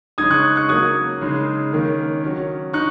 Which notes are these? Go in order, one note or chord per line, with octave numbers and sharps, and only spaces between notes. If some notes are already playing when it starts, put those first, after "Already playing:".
C#3 G#3 D#4 D#6 G#6
C#6 F#6
C#6 F#6
F#3 A#3 C#4 D#6 G#6
C#3 G#3 D#4
D#3 A#3 C#4
F#3 C#4
D#4 C#6 F#6